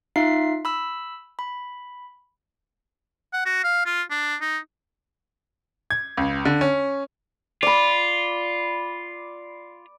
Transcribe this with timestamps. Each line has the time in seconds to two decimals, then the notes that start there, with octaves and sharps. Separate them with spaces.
0.16 D#4 F4 E5 F5 C7
0.65 B5 E6
1.39 B5
3.33 F#5
3.46 F#4
3.64 F5
3.86 F4
4.11 D4
4.41 D#4
5.90 G#6
6.17 C#2
6.45 D3
6.61 C#4
7.63 F4 D5 B5